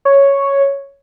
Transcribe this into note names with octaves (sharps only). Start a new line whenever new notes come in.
C#5